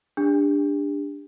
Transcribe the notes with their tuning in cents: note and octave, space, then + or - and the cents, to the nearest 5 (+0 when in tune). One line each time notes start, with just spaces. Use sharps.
D4 -5 G4 +40